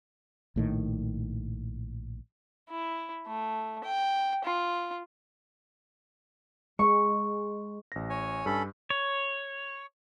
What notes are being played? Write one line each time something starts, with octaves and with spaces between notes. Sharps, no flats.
A#1 A2 D#3
E4
A3
G5
F4
G#3 C#6
A1 A#6
C#5 G#5
G2 C#4 A4 B5
C#5